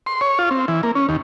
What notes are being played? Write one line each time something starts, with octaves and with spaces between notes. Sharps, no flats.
C6
C#5
F4
C4
E3
A#3
C#4
D#2